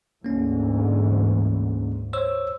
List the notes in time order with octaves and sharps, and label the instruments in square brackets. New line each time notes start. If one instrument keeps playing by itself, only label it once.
[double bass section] D2 G#2 E3 [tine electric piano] A#3 C#4
[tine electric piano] C5 C#5 E6